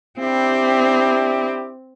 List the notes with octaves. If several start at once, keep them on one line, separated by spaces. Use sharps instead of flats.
C4 D4 E4 G4